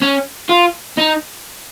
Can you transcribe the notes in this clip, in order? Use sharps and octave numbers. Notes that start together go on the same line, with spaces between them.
C#4
F4
D#4